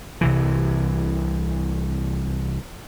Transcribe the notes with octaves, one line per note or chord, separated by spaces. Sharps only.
C2 C3 E3